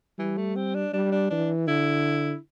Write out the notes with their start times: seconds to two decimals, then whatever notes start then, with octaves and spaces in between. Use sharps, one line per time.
0.18 E3 G3
0.37 A3
0.56 C4
0.75 D4
0.93 G3 D4
1.12 D4
1.31 E3 D4
1.67 D3 E4